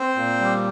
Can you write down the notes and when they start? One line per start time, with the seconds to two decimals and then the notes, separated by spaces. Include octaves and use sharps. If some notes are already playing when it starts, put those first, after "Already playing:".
Already playing: C4 C5
0.16 A#2
0.40 G3